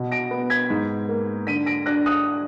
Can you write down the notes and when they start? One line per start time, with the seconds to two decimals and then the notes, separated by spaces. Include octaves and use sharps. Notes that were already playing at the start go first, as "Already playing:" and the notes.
Already playing: B2
0.12 A#6 D7
0.31 B3
0.50 G#6 B6
0.70 G#2
1.09 A#3
1.47 D3 B6 D#7
1.66 A#6 D7
1.86 D4 F#6 A#6
2.06 D#6 F#6